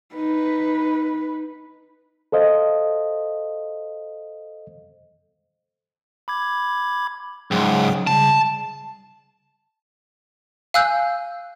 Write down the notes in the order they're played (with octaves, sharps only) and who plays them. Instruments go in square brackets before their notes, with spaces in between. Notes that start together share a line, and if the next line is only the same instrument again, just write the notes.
[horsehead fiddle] D#4 B4
[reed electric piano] A4 C5 D#5 F5
[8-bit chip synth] B5 D6 G#6
[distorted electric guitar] C#2 G#2 [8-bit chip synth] F#3 G#4 G5
[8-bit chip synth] C#3 G3 [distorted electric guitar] A5
[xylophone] F5 G#5 E6 F#6 G6